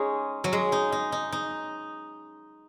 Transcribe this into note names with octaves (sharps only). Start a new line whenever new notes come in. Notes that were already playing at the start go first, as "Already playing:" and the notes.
Already playing: G#3 C#4 D#4
F#3
G#3
D#4
D#4
D#4
D#4